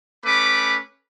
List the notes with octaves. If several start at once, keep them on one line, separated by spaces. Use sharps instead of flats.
A3 C#4 B4 B5 D6